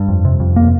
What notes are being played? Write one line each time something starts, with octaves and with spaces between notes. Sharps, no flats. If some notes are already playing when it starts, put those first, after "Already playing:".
Already playing: G2
F2
C3
F2
A#3